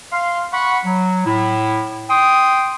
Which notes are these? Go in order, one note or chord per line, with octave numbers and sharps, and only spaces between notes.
F5 C6
F#5 B5 C#6
F#3
A2 E4
G5 C6 D#6